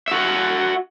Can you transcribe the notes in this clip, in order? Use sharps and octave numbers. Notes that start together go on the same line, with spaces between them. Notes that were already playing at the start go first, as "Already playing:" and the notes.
F#4 E5